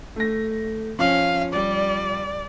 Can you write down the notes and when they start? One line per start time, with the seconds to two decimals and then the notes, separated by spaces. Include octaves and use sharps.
0.16 A3 A#6
0.99 F3 C#4 F5
1.53 G3 D5